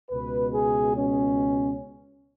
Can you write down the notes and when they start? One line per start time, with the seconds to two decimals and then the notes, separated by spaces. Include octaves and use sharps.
0.10 C#2 B2 B4
0.54 G#4
0.96 C#4